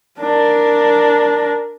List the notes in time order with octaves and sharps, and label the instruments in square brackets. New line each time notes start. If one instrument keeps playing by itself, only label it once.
[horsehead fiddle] D4 A#4